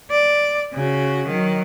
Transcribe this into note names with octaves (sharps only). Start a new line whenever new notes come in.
D5
C#3 F#4
D#3 F#3